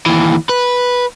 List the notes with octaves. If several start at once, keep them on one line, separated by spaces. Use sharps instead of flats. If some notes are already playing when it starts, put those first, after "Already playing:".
D#2 E3
B4